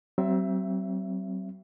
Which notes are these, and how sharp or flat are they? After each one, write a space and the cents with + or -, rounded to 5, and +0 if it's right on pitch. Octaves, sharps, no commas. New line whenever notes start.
F#3 +45 C4 +5 E5 +20